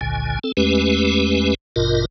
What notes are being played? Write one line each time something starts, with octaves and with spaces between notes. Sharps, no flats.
G#1 C#2 A#2 D3 G#5
C4 A4
E2 G#3 A3 C#4 G4 B4
A1 G2 B2 F4 A#4 D#5